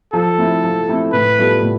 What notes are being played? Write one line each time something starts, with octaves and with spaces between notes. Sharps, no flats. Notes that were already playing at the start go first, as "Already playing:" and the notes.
F3 A4
A3 C4 E4
F3
A3 C4 E4
A2 B4
G3 B3 F4 A4
A2